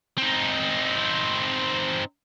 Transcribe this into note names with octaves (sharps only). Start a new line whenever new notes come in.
C4 D#4